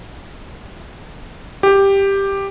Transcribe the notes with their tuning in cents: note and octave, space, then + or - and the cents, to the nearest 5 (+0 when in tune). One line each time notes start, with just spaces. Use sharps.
G4 +5